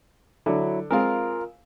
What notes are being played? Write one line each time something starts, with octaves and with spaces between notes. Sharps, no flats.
D3 F#3 E4
G#3 C4 F4 A#4 F5